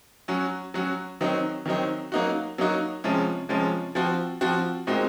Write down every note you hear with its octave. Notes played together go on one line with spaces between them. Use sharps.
F#3 C#4 F#4
F#3 C#4 F#4
D#3 F#3 C4 D#4
D#3 F#3 C4 D#4
F#3 A#3 D#4 F#4
F#3 A#3 D#4 F#4
C3 F3 G#3 C#4
C3 F3 G#3 C#4
F3 C4 F#4
F3 C4 F#4
A#2 G#3 C4 D#4 F#4